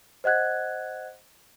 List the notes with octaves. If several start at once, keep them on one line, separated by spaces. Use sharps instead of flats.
C5 D#5 F#5 F#6 G#6